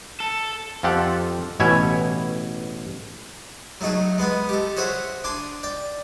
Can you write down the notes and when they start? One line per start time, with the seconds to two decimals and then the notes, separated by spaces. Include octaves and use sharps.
0.20 A4
0.83 F2 F4 G4 A4 F#5
1.60 A1 B2 E4 C#5 E5 G#5
3.81 F#3 A3 D#4 F#4 G#4
4.18 G#3 B3 F#5 G#5
4.49 G4 A4
4.77 F#4 G#4 C5 C#5 E5 F#5
5.24 D4 D5 G#5 C6
5.63 D5 G5